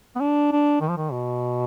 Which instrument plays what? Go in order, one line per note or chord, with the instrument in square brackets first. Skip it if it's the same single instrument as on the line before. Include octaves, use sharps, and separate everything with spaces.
[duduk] B3
D4
D4
D#3
F3
D#3
B2